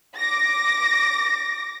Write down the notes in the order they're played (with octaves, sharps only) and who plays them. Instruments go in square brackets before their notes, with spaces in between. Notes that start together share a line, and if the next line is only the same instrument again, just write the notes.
[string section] D6 A#6